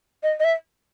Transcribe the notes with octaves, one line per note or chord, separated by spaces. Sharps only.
D#5
D#5
E5